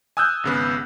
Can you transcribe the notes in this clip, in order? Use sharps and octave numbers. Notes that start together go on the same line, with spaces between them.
G#5 D#6 E6 F#6 G6
G#1 C#3 B3